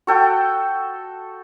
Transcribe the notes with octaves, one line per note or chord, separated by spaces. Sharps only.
F#4 A4 G5